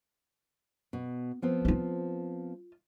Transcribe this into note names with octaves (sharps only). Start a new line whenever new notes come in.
B2
F3 B3 C4
E4 F4